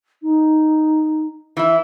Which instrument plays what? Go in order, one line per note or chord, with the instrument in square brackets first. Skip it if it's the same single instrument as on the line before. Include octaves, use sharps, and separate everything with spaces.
[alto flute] D#4
[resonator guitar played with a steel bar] E3 E4